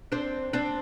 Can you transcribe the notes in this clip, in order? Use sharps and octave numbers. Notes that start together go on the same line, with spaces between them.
C4 D4
C4 D4